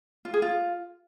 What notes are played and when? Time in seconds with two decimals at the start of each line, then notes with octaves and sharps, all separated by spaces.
0.25 F4
0.34 G#4
0.42 F4